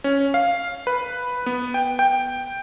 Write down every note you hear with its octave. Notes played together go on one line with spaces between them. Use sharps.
C#4
F5
B4
B3
G5
G5